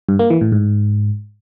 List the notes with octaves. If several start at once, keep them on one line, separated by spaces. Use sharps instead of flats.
G2
A#3
E3
A2
G#2